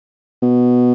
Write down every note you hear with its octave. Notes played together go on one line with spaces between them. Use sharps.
B2